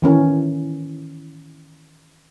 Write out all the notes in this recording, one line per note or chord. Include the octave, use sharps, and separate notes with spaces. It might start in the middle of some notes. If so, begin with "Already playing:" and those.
D#3 E3 C#4 A#4